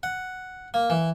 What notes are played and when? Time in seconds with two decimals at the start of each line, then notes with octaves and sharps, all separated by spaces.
0.03 F#5
0.74 A#3
0.90 E3